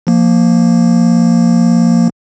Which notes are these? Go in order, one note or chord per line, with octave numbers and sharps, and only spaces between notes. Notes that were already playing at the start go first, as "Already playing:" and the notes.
F3 A#3